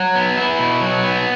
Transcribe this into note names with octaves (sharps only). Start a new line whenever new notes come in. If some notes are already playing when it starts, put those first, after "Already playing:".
Already playing: F#3
B3
E4
B2
F#3
B3